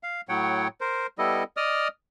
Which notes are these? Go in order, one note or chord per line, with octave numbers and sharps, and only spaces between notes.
F5
A2 F#3 C#5 F#5 G5
A#4 C5
G3 B3 E4 A4 D#5
D5 D#5 D#6 F6